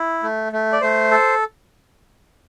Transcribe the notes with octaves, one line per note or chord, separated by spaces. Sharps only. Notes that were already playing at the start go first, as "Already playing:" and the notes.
Already playing: E4
A3
A3
D5
A3 C5
A4